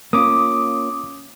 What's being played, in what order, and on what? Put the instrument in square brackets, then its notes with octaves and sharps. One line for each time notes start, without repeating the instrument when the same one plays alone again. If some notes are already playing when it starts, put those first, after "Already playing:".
[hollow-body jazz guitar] A#3 C#4 F4 [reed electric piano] D6 D#6